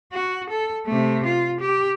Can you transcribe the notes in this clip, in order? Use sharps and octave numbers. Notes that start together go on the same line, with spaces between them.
F#4
A4
C3 A3
F4
G4